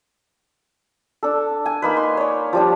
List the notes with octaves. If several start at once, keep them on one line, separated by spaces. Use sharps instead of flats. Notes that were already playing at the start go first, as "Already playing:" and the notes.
D4 A4
G#5
A#3 D#4 B4
C6
C#5 D5
F3 G3 D4